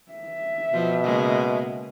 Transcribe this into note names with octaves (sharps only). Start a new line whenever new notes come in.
E5
B2 F3
C#3 G#3 A#3